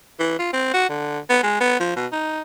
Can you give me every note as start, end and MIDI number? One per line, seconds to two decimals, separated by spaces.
0.20 0.34 52
0.39 0.50 65
0.53 0.71 60
0.73 0.89 66
0.89 1.19 50
1.29 1.40 59
1.43 1.60 56
1.60 1.75 59
1.80 1.92 53
1.96 2.06 47
2.12 2.41 63